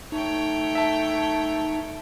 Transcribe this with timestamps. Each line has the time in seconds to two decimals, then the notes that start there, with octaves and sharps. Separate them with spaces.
0.12 A3 D#4 C#5 G5
0.75 E5 A5